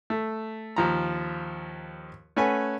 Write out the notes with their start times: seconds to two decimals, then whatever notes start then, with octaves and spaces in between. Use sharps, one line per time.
0.10 A3
0.76 D#2 F3 A#5
2.36 A3 C#4 B4 F#5 G#5